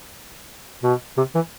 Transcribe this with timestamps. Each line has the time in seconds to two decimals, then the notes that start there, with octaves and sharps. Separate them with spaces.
0.83 B2
1.17 C3
1.35 E3